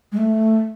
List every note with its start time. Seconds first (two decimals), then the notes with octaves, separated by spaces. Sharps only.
0.12 G#3
0.17 A3